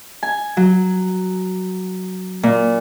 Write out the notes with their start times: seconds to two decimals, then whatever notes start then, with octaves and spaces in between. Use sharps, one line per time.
0.23 G#5
0.57 F#3
2.43 A#2